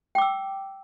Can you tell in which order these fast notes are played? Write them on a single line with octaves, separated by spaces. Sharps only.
G5 D6 E6